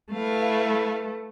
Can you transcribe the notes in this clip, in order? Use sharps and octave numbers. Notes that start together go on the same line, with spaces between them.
A3 E4 B4 F5